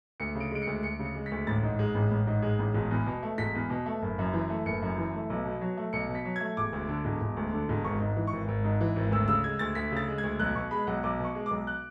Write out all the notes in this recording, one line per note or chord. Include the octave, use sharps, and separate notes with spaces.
D2 C#7
C#3
D7
G#3 D7
C#7
D2
D2 C#7
C#3
C#7
G#3
B6
D2
A1 A6
G#2
G#3
A1
A1
G#2
G#3
A1
E1
E2
B2
A3
E1 B6
E2
B2
A3
F#1
F#2
E3
A3
F#1 C#7
F#2
E3
A3
B1
B2
F#3
A3
B1 C#7
B2
B6
F#3
A3 G#6
E1 D6
D2
D3
E1
E1
D2
D3
E1
G#1 C#6
G#2
E3
C#6
G#1
G#1
G#2
E3
G#1
D2 E6
C#3 E6
G#3 G#6
D2 A6
D2 B6
C#3 A6
G#3
G#6
D2
B1 F#6
B2 C#6
G#3 B5
B1 F#5
B1 D6
B2
C#6
G#3
B1 D6
F#6